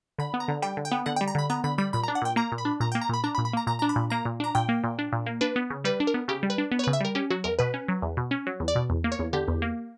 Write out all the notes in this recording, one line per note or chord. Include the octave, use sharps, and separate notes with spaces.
D3 B5
B3
A#5
D3
G3 G5
D3
G5
B3
D3 F#5
G5
G3
A#5
D3 B5
B3 A#5
D3 B5
G3 B5
A#2 B5
A#5
D4
F#5
A#2 G5
A#3 A#5
A#2
B5
D4
A#2 A#5
G5
A#3
A#5
A#2 B5
D4 A#5
B5
A#2
B5
A#3 A#5
A#2 A#5
D4 A#5
B5
A#2
A#3 A#5
A#2
D4 A#5
A#2 G5
A#3
A#2
D4
A#2
A#3
D4 B4
B3
C#3
G3 B4
D4
A#4
B3
C#3 G4
G3
B4
D4
B3
C#5
B4
C#3
E5
G3 A#4
C#4 G4
F#3 F#4
E2 A#4
B2 B4
C#4
F#3
E2
B2
C#4
F#3
E2
D5
B2
E2
A#3
C#5
E2
D3 G4
E2
A#3